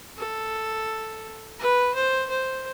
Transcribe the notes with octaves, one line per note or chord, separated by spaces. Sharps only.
A4
B4
C5
C5